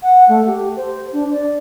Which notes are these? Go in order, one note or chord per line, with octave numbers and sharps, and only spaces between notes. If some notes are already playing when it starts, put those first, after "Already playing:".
F#5
A3
G4
C5
D4
D5